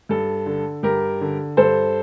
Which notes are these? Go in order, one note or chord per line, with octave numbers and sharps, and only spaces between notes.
G2 A4
D3
G2 G4 A#4
D3
G2 A4 C5